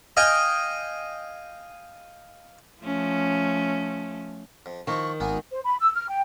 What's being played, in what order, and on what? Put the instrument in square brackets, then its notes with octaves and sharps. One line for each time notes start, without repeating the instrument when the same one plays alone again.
[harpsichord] D#5 F5 G5 G#5
[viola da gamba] F3 A3 C#4
[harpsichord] F2
[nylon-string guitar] D#3 [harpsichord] F3 A#3 [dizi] C#6
[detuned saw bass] G#1 [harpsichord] A#3 B3 [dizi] G#5
[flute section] C5
B5
E6
F6
G5